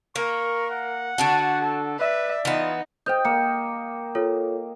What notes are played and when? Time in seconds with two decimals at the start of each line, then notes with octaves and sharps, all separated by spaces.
0.16 A#3 A#4 C#6
0.70 F#5
1.18 D3 D4 F#4 A5
1.60 A4
1.99 B4 D5 E5
2.45 E3 B3 D#4 F4
3.06 C5 D#5 G5 G6
3.25 A#3 C#7
4.15 F4 A4 C#5